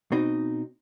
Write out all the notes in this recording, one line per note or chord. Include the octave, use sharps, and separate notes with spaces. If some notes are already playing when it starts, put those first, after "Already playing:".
B2 C4 D#4